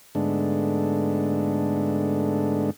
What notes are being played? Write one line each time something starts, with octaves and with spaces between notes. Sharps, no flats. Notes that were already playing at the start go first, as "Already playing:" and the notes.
G#2 D3 G#3 A3 B3 D4